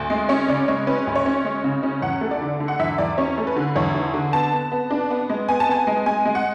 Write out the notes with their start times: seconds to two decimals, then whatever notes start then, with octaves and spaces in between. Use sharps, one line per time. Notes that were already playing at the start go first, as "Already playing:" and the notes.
Already playing: D2
0.10 G#3
0.29 C#4 C#5
0.48 C#3 D5
0.68 G#3 C#5
0.87 C#4 B4
1.07 D2
1.16 C#5
1.26 C#4
1.45 G#3
1.64 C#3
1.83 C#4
2.02 E2 F#5
2.21 A3
2.31 D5
2.41 D3
2.60 D3
2.68 F#5
2.79 E2 E5
2.98 E2 D5
3.18 C#4 C#5
3.38 A3
3.47 B4
3.56 D3
3.76 E2 C#5
3.95 D3
4.14 D3
4.33 B3 A5
4.53 B3
4.72 B3
4.90 D4
5.10 B3
5.30 G#3
5.49 B3 G#5
5.60 A5
5.68 B3 G#5
5.87 G#3
6.06 G#3 G#5
6.25 G#3
6.35 F#5